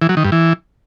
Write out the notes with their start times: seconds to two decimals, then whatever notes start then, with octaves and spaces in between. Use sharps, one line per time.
0.02 E3
0.09 F#3
0.17 D#3
0.24 G2
0.32 E3